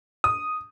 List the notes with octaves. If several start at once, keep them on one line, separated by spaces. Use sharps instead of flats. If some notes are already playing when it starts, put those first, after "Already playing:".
D#6